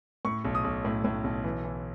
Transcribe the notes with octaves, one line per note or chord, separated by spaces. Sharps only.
A2 C#6
B1
D#6
B1
A2
A2
B1
E3
E3